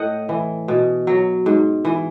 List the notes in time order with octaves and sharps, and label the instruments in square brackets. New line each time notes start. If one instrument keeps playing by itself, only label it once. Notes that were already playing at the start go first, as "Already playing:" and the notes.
Already playing: [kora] A2 D#5 F#5
E3
B2
F#3
G#2
E3